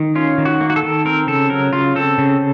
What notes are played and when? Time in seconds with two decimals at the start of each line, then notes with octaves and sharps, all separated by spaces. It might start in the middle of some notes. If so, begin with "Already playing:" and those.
Already playing: D#3
0.15 C#4 F4
0.38 D#3
0.45 F#4
0.61 A#3
0.70 F#4
0.76 A4
0.83 D#3
1.05 C4 A#4
1.27 C#3 A4
1.50 F#3 A#4
1.73 C#3 F4
1.95 C4 A4
2.18 C#3